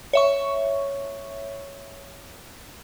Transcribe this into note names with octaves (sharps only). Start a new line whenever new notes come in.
C#5 E5 C#6